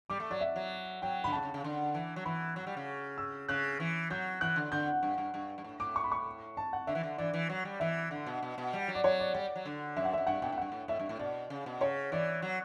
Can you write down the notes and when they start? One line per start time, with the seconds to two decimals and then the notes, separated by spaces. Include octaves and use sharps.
0.10 G3 D6
0.20 A3
0.30 F#3 D5
0.41 E5
0.56 F#3
1.02 F#3 G5
1.24 D3 B5
1.32 C#3 A5
1.43 C#3
1.54 C#3
1.64 D3
1.94 E3
2.16 F#3
2.25 E3 B5
2.56 F#3
2.67 G3
2.77 C#3
3.18 E6
3.48 C#3 F#6
3.80 E3
4.10 F#3 G6
4.41 E3 F#6
4.56 D3
4.72 D3 G6
5.03 G2
5.18 G2
5.34 G2
5.58 G2
5.64 A2
5.80 A2 D6
5.96 C#6
6.04 B5
6.12 C#6
6.57 A5
6.73 F#5
6.87 D3 E5
6.95 E3
7.03 D3
7.18 E3 D5
7.33 E3
7.49 F#3
7.65 G3
7.80 E3 E5
8.11 D3
8.26 B2
8.43 B2
8.58 B2
8.73 G3
8.88 F#3
8.95 D5
9.04 F#3 C#5
9.20 D5
9.34 G3 D5
9.56 F#3
9.65 D3
9.96 F#2 E5
10.05 F#5
10.13 F#2 E5
10.27 G2 F#5
10.42 B2 G5
10.52 A2
10.58 G2 F#5
10.72 A2
10.88 A2 E5
10.99 G2
11.09 A2
11.19 B2 D5
11.50 C#3
11.66 B2
11.81 C#3 C#5
12.12 E3 D5
12.42 F#3